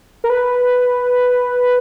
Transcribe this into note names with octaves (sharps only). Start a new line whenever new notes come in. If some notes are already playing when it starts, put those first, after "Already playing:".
A#4
B4